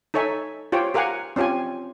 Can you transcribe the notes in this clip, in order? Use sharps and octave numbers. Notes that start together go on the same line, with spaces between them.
D#4 A4 C#5 E5 G#5
F4 G4 C5 C#5 G5
G4 A#4 F5 F#5 G#5
C4 C#4 F4 G4 G#5